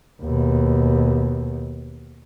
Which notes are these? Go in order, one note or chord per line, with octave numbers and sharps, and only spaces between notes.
D#2 B2